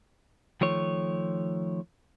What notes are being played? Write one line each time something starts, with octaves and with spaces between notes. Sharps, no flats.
D#3 F3 A3 C#5